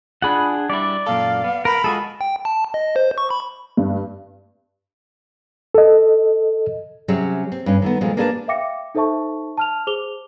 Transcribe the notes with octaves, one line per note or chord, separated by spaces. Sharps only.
D4 F4 G#4 F#5 B5
G3 D4 E4 D5
F#2 A#2 A4 F5
B3
A#4 B5
G#3 F4 F#4 G#4 A4
G5
A5
D#5
C5
C#6
B5
G2
A4 D#5
C3 F#3 C#4 G4 G#4 E5
C4
G2 C#4
D#3 A3 B3
A#2 F3 G#3 A3
A#3 D4 G#4 B4 E5 A5
E5 F5 G5 D6 A#6 C#7
D#4 A4 C5 E5 A5 C#6
A5 F6 F7
G#4 C5 D6 F7 G7